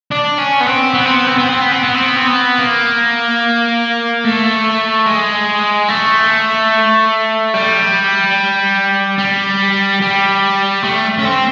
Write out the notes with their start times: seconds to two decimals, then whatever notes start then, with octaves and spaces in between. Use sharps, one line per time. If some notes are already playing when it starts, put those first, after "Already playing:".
0.12 D4
0.39 C#4
0.61 B3
0.67 C4
0.94 B3
1.05 C4
1.16 B3
1.27 C4
1.38 B3
1.50 C4
1.61 B3
1.72 C4
1.84 B3
1.95 C4
2.05 B3
2.17 C4
2.28 B3
2.59 A#3
4.24 A3
5.06 G#3
5.88 A3
7.54 G3
9.19 G3
10.02 G3
10.84 A3
11.19 C#4
11.25 C4